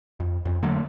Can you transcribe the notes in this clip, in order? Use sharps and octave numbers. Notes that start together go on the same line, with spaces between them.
F2
F2
D3 F#3 A3 A#3